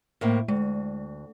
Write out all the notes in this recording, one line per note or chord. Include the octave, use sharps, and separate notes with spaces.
A2 A#3 C4
D2 G#3